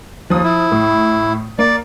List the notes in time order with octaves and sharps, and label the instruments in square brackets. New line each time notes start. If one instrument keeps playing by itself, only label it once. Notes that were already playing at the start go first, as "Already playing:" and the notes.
[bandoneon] D#2 [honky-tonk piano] F3 D#6
[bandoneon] E4
[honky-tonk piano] A2
[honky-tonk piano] A#3 [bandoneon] D5